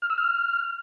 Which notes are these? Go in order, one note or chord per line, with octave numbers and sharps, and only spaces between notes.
F6
E6
F6